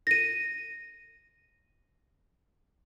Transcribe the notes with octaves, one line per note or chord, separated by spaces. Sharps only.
A#6 D#7